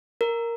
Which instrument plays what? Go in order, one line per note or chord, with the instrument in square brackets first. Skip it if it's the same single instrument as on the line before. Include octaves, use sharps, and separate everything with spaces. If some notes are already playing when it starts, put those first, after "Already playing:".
[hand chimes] A#4